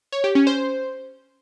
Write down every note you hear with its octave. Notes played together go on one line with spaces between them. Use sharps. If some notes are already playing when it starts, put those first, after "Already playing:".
C#5
G4
C#4
C5